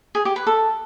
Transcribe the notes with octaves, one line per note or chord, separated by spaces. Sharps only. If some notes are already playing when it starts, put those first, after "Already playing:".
G#4
G4
B4
A4